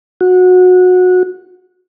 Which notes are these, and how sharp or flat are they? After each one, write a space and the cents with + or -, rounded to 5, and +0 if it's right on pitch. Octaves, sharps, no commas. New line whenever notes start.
F#4 -20